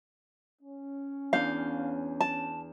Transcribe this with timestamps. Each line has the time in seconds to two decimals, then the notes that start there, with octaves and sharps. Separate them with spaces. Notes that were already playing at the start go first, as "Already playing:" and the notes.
0.62 C#4
1.33 E2 D4 F5 G6
2.20 A5